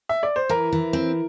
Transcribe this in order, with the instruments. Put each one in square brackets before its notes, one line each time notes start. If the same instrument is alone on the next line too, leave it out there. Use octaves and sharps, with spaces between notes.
[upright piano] E5
D5
C5
[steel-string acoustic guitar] E3 [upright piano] A#4
[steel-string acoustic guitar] E3
C4